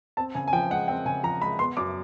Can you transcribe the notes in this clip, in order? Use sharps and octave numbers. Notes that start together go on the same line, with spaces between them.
C4 A5
C#3 G#5
G#5
F3 G5
G#3 F#5
C4 G5
C#3 G#5
F3 A#5
G#3 B5
B3 C6
F#2 D6